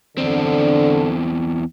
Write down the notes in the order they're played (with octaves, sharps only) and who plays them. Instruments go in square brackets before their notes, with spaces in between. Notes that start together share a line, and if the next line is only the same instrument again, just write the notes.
[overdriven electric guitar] E2 C4 [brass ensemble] D3